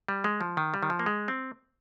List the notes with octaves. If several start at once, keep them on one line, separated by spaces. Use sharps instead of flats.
G3
G#3
F3
D#3
G3
D#3
F3
A#3
G#3
C4